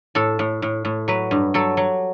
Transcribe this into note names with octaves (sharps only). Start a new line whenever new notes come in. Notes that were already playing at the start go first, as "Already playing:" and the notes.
A2 A4
A2
A2
A2
F#3 B4
G2
F#3 A4
F#3